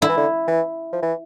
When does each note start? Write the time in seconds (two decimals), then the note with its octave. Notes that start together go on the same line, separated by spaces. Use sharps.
0.02 D3 E4
0.09 E3
0.17 D3
0.48 E3
0.93 F3
1.02 E3